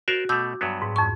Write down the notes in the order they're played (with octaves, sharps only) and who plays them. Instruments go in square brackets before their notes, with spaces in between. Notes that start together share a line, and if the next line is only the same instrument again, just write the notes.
[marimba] F#4 [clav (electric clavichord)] A#4 C5 D5
[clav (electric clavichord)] B2 A3 [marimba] D6 E6 G6
[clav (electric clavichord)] G2 F#3 B3
[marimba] G#2
F2 C#6